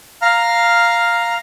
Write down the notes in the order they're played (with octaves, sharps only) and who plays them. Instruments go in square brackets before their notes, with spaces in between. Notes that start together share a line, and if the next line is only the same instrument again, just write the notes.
[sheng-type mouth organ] F5 A#5 F6